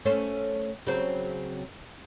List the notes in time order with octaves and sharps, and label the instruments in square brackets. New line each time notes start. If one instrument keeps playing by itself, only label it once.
[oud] A3 C#4 C5
C#3 F#3 C4